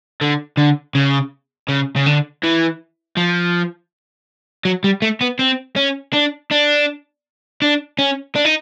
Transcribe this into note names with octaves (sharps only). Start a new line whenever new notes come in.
D3
D3
C#3
C#3
C#3
D3
E3
F3
F#3
G3
A3
B3
C4
C#4
D4
D4
D4
C#4
D4
D#4